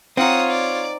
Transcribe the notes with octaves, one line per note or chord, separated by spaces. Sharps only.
C4 D#4 F4 C#5 F#5 D#6
D5